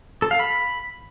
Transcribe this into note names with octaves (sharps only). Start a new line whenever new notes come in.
A4
F5
B5